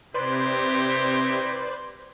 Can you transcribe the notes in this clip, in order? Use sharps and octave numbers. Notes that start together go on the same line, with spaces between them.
C3 D#4 E4 G4 B4 C5 D5 C6